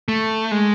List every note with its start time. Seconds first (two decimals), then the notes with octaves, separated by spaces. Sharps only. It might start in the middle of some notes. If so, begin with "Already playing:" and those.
0.08 A3
0.51 G#3